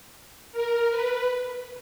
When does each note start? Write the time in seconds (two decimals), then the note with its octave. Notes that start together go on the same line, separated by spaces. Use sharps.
0.52 A#4
0.89 B4